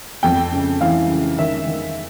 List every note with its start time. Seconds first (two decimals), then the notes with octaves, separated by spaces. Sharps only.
0.23 F2 G5
0.53 C#3
0.81 E3 F5
1.10 C#3
1.38 D#3 E5
1.67 D#3